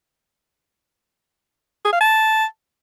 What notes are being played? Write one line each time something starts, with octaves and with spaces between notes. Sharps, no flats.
G#4
F5
A5